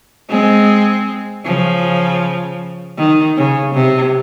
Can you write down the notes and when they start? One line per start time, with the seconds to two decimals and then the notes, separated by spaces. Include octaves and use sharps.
0.30 G#3 C4
1.45 C#3 F3
2.98 D#3
3.37 C#3
3.74 C3